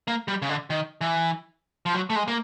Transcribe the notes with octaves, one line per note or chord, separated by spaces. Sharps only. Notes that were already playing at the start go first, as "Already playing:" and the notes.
A#3
G3
C#3
D3
D#3
E3
F3
F#3
A3
G#3
A#3